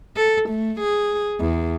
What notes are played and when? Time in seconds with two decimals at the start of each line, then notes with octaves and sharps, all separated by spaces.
0.17 A4
0.49 A3
0.80 G#4
1.41 E2